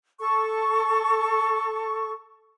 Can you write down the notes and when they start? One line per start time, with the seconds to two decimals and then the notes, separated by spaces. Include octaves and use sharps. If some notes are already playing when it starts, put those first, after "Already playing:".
0.19 A4 C#6